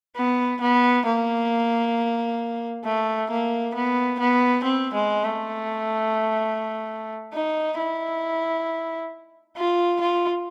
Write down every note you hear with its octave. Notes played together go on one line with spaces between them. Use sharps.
B3
B3
A#3
A3
A#3
B3
B3
C4
G#3
A3
D#4
E4
F4
F4